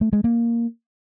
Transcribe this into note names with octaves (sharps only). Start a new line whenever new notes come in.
A3
G#3
A#3